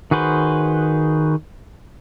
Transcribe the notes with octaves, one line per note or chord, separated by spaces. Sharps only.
D#3 F#4 G#4 B4 C5